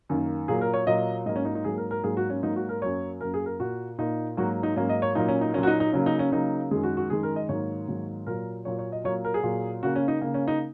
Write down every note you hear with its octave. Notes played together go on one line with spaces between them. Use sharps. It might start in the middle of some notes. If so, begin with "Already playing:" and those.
F#2 D#3 A#3
A#2 F#3 A#3 G#4
A#4
C#5
A#2 F#3 A#3 D#5
G#2 F#3 A#3 D#5
C#4
D#4
D#4
G#2 F#3 A#3 G#4
A#4
A#4
G#2 F#3 A#3 G#4
F#4
C#4
G#2 F#3 A#3 D#4
F#4
A#4
F#2 F#3 A#3 C#5
F#2 F#3 A#3 A#4
G#4
A#4
A#2 A#3 F#4
A#2 A#3 D#4
G#2 F#3 A#3 F#4
D#4
G#2 F#3 A#3 C#4
D#5
C#5
A#2 F#3 A#3 D#4
C#4
D#4
A#2 F#3 A#3 C#4
F#4
D#4
D#4
C#3 F#3 A#3 C#4
D#4
C#4
C#3 F#3 A#3 D#4
F#2 D#3 G#3 G#4
F#4
F#4
F#2 D#3 G#3 G#4
A#4
D#5
G#2 D#3 F#3 A#3 C#5
G#2 D#3 F#3 A#3
A#2 F#3 A#3 A#4
A#2 F#3 A#3 C#5
C#5
D#5
A#2 F#3 A#3 C#5
A#4
G#4
A#2 F#3 A#3
C#3 A#3 F#4
C#4
D#4
C#3 A#3
C#4
D#4